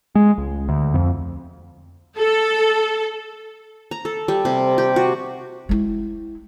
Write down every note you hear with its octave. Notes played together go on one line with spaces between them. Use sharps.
G#3
C#2
D2
F2
A4
A#5
A4
G3
C3
G4
F#4
G#3 E4